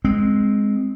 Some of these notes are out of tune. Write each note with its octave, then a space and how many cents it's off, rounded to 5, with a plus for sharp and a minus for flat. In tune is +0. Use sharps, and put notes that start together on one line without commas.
G#3 +0 C4 -5